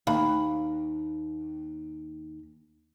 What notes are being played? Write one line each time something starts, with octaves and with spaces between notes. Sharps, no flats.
D#2 F5 B5